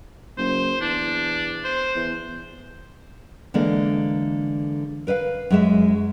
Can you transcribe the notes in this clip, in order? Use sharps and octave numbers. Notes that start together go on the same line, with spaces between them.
F#1 C5
E2 D4
C5
E2
D3 E3 G#3 A#3 D5
A#4 B4 D#5 F5
F#2 G#3 E5